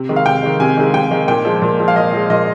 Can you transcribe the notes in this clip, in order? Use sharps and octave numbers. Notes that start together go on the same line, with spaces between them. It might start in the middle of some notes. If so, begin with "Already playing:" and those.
Already playing: C3
D#3 G#3
F5
C3 G5
D#3 G#3
C3 G#5
D#3 G#3
C3 G5
D#3 G#3
A#2 G5
F3 G#3
A#2
F3 G#3
F5
A#2 D#5
F3 G#3
A#2 D#5